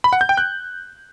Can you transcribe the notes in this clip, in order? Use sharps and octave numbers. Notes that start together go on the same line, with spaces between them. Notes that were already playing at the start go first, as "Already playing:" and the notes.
B5
F#5
G6
G5
F#6